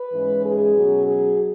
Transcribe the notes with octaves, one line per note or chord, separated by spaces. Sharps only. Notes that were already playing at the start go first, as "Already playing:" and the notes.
Already playing: B4
G#2 E3 G#3 C#4
G#4
B2 F#3 C#4
G#4